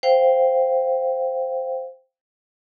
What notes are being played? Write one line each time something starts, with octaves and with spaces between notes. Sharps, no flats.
C5 F5 G5